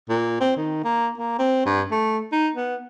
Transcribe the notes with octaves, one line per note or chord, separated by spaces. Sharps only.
A#2
C4
D#3
A#3
A#3
C4
G2
A3
D#4
B3